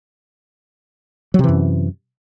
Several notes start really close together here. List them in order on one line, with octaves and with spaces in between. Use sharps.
F#3 C3 E3 F#2